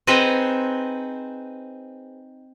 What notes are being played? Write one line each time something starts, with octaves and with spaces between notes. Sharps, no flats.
C4 D#4 G#4 B4 C5 F#5